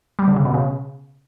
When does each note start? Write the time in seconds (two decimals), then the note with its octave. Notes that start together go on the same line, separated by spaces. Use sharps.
0.19 G3
0.28 D3
0.36 C#3
0.45 B2
0.54 C#3